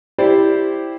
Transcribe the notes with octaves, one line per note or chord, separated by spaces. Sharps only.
E4 G4 C5 D5